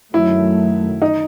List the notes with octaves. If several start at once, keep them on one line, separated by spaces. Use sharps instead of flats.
F#2 D#3 F#3 A3 E4
D#4